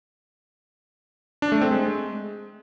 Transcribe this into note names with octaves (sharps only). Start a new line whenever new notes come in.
D4
A3
C4
G#3